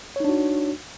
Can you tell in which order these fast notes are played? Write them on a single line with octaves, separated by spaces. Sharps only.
C#5 D#4 D4 F#4